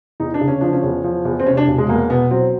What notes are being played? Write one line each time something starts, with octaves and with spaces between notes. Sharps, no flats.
E2 D#4
D4
C#3
C#4
F3 D4
C#4
E2
F3
E2
C4
C3 C#4
D4
E1
G#3
E2 A#3
B2 B3
F#3 C4